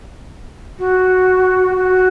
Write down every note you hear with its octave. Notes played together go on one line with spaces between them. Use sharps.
F#4
F#4